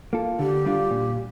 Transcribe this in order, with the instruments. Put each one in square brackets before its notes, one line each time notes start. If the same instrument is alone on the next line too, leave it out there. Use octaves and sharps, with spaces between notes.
[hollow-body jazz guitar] A#3 F4 A4
[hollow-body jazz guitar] D3 [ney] G4
[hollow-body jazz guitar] G3 D4 F4
A#2